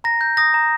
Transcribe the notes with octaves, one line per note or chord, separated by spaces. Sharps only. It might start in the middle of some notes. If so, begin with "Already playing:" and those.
A#5 A#6
G6
D#6 A#6
A#5